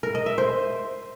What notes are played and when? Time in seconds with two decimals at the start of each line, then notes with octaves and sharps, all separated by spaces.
0.03 A#4
0.15 D#5
0.26 E5
0.38 C5